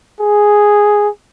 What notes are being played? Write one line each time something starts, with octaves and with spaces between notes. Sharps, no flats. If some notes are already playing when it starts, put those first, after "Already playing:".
G#4